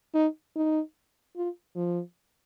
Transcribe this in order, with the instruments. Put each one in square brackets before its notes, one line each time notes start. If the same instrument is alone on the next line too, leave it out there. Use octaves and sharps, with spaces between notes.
[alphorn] D#4
D#4
F4
F3